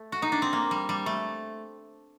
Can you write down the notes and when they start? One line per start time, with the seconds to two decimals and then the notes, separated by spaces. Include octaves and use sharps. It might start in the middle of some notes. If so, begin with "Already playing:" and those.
Already playing: A3
0.12 F#4
0.22 D#4
0.32 D4
0.42 C4
0.53 A#3
0.71 G3
0.89 G3
1.06 A3